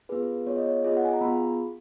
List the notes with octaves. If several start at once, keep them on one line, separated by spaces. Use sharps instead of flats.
B3 F4 G#4 B4
B3 F4 G#4 C#5
D#5
C#5
B3 F4 G#4 D#5
F#5
G#5
A#5
B3 F4 G#4 B5